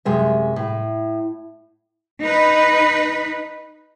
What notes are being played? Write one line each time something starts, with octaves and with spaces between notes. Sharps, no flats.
F#2 C3 G#3 E5
A2
D#4 B4